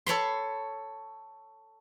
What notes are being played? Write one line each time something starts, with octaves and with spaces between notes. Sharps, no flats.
A4 C#5 B5 C6